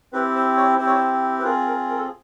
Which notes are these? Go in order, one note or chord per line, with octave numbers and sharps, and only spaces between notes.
C4 E4 G4 B4
C5
C#5
C4 E4 G4 C5
C#5
C5
B4
C4 F4 G#4 A#4
A#4
A#4
A4
G#4